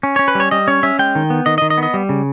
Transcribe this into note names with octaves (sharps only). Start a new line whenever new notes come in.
C#4
C#4 C#5
B4
G3 C#5
G3 D#5
C#4 C#5
C#4 E5
G#3 G5
D#3
B3
D#3 D#5
D#5
D#3
D#5
B3
D#5
G3
C#3